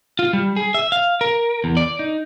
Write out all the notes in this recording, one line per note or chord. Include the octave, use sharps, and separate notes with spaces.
F4
G3
G#4
E5
F5
A#4
E2
D5
D#4